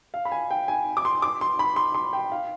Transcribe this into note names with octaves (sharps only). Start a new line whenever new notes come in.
F5
B5
G#5
G5
G#5
D6
C6
D6
C6
B5
C6
C6
G5
F5